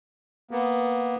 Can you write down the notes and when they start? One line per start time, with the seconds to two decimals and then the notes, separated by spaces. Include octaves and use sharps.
0.51 A#3 B3